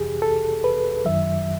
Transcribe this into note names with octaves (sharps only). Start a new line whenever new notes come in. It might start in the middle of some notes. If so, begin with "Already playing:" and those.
Already playing: F2 C3 E3 G4 G#4
A4
B4
F#2 D#3 F#3 E5